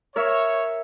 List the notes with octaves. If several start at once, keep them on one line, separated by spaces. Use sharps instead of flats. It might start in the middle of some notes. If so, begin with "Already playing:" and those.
A#4 C#5 E5